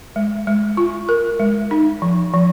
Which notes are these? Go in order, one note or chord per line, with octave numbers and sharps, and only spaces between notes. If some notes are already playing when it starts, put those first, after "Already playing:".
G#3
G#3
F4
A#4
G#3
D#4
F3
F3